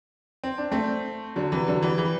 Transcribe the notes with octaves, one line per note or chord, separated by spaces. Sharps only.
C4
D4
A3 C4
D3 F#3
C3 E3
D3 F#3
E3 G3
E3 G3